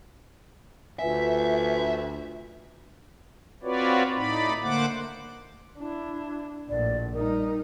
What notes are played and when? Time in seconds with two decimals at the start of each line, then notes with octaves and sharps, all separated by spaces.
0.99 D2 F4 B4 E5 G#5
3.63 C4 F4 F#4 B4 C#5 D5
4.15 A2 D#4 D5 B5
4.62 D3 A3 A#3 C5 F#5 D6
5.79 D4 E4
6.69 A#1 A2 D5
7.13 G3 D#4 A#4